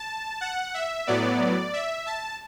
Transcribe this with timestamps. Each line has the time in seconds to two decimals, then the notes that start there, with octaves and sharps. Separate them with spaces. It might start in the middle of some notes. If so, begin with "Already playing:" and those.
Already playing: A5
0.41 F#5
0.74 E5
1.07 A2 F#3 B3 D5
1.73 E5
2.06 A5